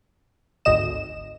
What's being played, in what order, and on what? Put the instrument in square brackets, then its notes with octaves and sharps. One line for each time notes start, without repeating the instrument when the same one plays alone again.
[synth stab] G#1 D2 D#5 E7